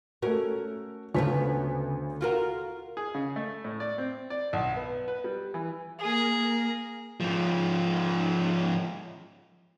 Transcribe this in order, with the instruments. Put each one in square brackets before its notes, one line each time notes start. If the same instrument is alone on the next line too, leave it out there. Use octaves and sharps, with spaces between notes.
[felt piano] A3 F#4 [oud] C#4 A#4
[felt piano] D2 A5 B6 [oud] C#3 B3 C#5
[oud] F4 F#4 A#4
[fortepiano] G#4
C#3
A3
A2
D5
C4
D5
B1
B3
B4
G3
E3
[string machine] A#3 A#4 [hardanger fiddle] G#4
[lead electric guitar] G#2 F3